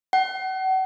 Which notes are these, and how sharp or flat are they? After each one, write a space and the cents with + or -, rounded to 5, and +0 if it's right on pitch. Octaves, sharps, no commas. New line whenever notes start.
F#5 +35